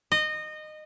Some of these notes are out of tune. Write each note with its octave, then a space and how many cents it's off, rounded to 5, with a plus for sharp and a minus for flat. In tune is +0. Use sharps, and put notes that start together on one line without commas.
D#5 -20